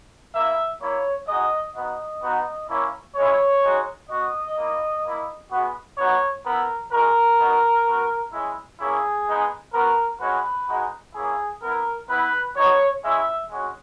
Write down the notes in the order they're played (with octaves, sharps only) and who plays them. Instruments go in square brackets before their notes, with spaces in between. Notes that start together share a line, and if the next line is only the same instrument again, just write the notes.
[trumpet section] A#3 E4 E5
A#3 E4 C#5
G#3 D#4 F#4 D#5
B3 D#4 F#4 D#5
B3 D#4 F#4
A#3 C#4 E4
G#3 C#4 E4 C#5
G#3 D#4 F#4
B3 F#4 D#5
A#3 E4
A#3 E4
G#3 B3 F#4
B3 D#4 F#4 C#5
B3 E4 A#4
G#3 D#4 F#4 A#4
B3 D#4 F#4
B3 F#4
G#3 C#4 E4
A#3 C#4 E4 G#4
G#3 B3 D#4
B3 F#4 A#4
G#3 C#4 F#4 B4
G#3 D#4 F#4
A#3 C#4 E4 G#4
B3 E4 A#4
B3 E4 B4
B3 D#4 F#4 C#5
G#3 C#4 E4 E5
G#3 C#4 F#4